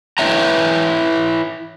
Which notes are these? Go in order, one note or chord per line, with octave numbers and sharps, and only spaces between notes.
E4 B4 C#5 E5 G5 A#5